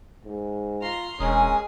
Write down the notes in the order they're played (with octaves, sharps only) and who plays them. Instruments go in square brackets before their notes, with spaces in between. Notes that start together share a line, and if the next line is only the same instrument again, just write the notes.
[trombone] G#2
[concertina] F4 [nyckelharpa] A#5 C6
[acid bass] E1 [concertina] G#3 A#4 D#6 [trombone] C#4 [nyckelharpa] G#4